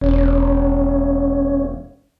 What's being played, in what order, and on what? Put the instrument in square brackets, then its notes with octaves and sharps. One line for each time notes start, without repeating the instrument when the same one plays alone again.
[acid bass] E1 [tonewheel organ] C#4 C#5